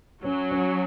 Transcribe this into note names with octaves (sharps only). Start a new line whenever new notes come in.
F#3 C#4
C#4